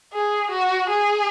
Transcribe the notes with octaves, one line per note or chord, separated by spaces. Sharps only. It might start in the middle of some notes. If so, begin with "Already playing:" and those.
G#4
F#4
G#4